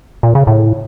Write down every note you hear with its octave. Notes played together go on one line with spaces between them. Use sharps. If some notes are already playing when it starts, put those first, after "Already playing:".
A#2
C#3
A2